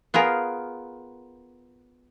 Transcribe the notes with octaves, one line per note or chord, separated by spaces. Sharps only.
B3 F4 G#4 A#4